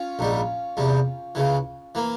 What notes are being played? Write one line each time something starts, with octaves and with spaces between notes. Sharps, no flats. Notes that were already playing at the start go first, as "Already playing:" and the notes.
Already playing: C#4 F4
A#1 G#2 G3
E2 C3 G3
C#2 C#3 E3
E3 A#3